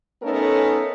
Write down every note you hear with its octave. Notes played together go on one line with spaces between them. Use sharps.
A3 B3 C#4 D#4 A4 A#4